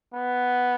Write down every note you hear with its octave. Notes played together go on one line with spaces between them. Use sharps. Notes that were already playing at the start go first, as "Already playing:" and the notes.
B3